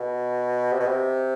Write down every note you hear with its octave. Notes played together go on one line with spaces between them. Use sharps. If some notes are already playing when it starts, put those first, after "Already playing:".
Already playing: B2
C3
B2
C3